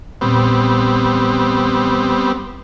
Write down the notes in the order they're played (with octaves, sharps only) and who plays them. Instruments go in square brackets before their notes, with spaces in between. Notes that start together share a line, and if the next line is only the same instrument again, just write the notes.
[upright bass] A#1 E2 [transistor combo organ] G3 B3 C4